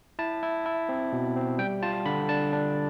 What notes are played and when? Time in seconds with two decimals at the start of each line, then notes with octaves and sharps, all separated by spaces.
0.19 E4 A5
0.43 E4
0.66 E4
0.89 C4
1.13 B2
1.36 C4
1.58 G3 G5
1.83 F4 A5
2.06 D3 B5
2.29 D4 A5
2.53 D4